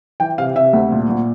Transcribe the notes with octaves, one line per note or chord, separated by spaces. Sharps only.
E3 G5
C3 F5
C3 E5
D2
A#2
A#2